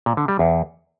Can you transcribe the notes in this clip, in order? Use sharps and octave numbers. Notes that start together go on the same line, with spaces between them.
A#2
D3
G3
E2